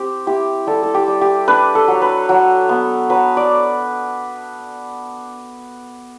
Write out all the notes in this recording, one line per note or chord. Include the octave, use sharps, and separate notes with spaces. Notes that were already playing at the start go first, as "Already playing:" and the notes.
Already playing: C4 G4
E4 G4
G3 A4
A4
G4
G3
G4
D4 B4
A4
F#3
B4
F#3
B3
F#3 B4
D5